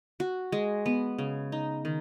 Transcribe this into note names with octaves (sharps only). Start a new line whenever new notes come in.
F#4
G#3
B3
C#3
D#4
D#3